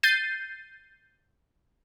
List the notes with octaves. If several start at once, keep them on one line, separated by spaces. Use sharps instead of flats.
G6 A6 C7 D#7